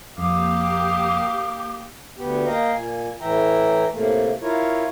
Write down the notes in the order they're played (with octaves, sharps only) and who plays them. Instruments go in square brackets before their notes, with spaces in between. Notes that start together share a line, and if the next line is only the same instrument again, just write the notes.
[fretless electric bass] F2 [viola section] A#3 G4 [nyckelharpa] F5 D#6 [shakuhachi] D6
[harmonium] D2 B3 G4
A#3 D#5 F5 G5 A#5
A#2 G#5
A2 E3 E5 G5 A#5
A2 C3 A3 A#3
E4 F4 A#4 C#5